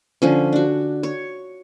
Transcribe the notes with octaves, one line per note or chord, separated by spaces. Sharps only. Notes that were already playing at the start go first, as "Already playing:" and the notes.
D3 F3 C#4
D4 F#4
C#5